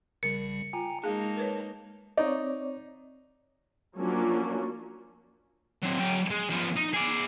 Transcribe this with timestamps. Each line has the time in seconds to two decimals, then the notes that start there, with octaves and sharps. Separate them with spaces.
0.23 A#1 C#3 G3 A#4 C#7
0.73 F4 G5 G#5 A#5
1.04 G#3 A#3 D#4 G#4 F5 A5
1.37 A#4 B4 C#5
2.17 C4 D#4 C#5 D5
3.97 F3 F#3 A#3 C#4 D4 F4
5.82 F#3 C4
5.99 F#3 G5
6.30 G#3
6.50 F3 B3
6.77 D#4
6.94 G#4 D5